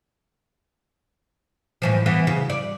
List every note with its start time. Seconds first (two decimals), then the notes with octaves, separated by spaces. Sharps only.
1.82 A2 E3 F3
2.06 E3 B3
2.27 C#3
2.50 D5